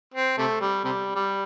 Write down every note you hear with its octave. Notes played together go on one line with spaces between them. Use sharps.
C4
C3 A3
G3
C3 G3
G3